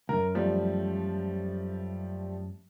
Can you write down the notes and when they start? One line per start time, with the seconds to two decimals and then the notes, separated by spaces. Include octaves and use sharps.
0.09 C#2 F#2 A#4
0.35 F3 G3 A3